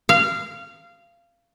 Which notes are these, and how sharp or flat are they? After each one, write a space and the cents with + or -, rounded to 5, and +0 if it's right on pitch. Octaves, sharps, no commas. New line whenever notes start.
F5 -20